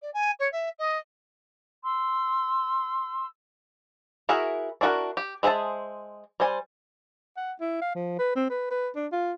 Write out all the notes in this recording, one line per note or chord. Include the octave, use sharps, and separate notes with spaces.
D5
G#5
C#5
E5
D#5
C6 E6
E4 F#4 G#4 A#4 E5
D4 E4 F#4 A4 A#4
G4
G#3 G#4 C5 E5 A5
G3 C5 G#5
F#5
E4
F5
F3
B4
C4
B4
B4
D4
F4